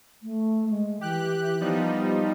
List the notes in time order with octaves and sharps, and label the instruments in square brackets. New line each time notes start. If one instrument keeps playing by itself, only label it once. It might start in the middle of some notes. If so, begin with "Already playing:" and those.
[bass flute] A3
G#3
[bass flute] E3 [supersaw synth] G4 F#6
[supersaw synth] F3 G3 D#4 [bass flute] B3